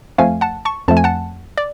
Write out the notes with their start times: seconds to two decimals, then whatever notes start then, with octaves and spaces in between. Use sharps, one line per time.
0.18 F2 F3 A3 F5 G#5
0.41 F#5 A5
0.65 A5 C#6
0.88 F2 F3 A3 A5
0.97 G#5
1.04 F#5 A5
1.58 D5